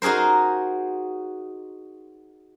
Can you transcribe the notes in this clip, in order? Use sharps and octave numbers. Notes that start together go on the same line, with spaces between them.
D#4 F#4 G#4 A#4 C5